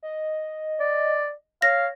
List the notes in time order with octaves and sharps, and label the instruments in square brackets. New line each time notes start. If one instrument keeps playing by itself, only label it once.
[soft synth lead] D#5
[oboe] D5
[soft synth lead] C#5 [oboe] F5 [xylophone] A#6